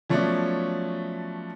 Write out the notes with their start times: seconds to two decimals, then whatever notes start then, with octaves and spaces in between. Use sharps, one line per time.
0.09 F3 F#3 A3 B3 C#4 D5